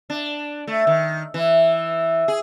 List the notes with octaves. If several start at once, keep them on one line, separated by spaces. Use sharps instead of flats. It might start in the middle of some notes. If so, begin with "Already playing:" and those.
D4
A3
D#3
E3
G#4